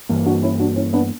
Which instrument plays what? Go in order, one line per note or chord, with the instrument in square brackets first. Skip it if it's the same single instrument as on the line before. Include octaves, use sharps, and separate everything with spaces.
[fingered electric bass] G2 E3 A#3
[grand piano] D4 F#4
C#4 E4
D4 F#4
C#4 E4
B3 D4